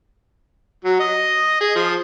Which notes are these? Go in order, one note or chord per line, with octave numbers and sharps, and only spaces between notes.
F#3
D#5
G#4
F3